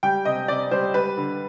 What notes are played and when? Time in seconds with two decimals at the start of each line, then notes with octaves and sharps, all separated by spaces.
0.03 G3 G5
0.25 C3 D#5
0.48 C3 D5
0.71 G3 C5
0.94 G3 B4
1.17 D3